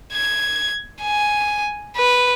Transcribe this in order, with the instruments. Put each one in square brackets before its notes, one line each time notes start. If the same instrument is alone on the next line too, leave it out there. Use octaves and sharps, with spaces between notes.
[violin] G#6
G#5
B4